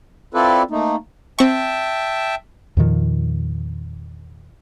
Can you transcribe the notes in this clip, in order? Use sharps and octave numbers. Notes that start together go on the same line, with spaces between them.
C4 E4 F4 A4 B4 D5
A3 A#3 D#4
C4 E5 G5 A5 C#6
E2 A#2 D#3 F3